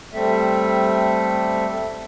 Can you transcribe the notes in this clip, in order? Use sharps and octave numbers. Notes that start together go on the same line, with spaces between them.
G3 A3 C4 A4 E5